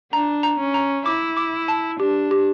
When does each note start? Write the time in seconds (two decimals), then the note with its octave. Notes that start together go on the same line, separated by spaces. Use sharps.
0.12 D4 A#5
0.43 A#5
0.59 C#4
0.74 A#5
1.06 E4 D6
1.37 D6
1.68 A5
1.99 D4 G4
2.31 G4